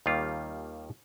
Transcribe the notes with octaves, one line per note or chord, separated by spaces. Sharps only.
D#2 D#3 G3 A#3 F4